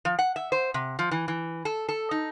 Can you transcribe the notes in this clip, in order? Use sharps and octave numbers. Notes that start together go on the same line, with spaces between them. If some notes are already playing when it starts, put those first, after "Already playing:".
F3
F#5
E5
C5
C3
F3
E3
E3
A4
A4
D#4